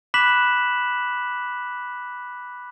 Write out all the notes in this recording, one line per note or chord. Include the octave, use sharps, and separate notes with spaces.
B5 D6 F#6 B6 E7 F#7